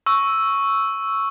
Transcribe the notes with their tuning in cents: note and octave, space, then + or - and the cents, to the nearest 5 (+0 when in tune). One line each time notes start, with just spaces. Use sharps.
C#6 +0 E6 +0